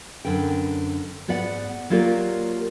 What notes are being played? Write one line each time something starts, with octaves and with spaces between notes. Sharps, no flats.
F#2 D3 B4 G5
G#2 B3 B4 D5 F#5
F#3 A#3 F4 G4 A#4 D5